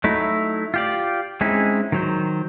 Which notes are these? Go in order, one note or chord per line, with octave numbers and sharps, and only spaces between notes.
F#3 A3 D#4 E4
F4 G4 D5
G#3 C4 C#4 D#4 E4
D#3 F#3 C5